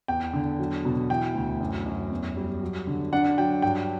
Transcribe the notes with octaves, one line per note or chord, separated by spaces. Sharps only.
E2 G5
D3
F#3
B2
E3 G5
D2
F#2
F#2
E2
G3
F#3
D3
D4 F#5
F#3 G5
G2 G5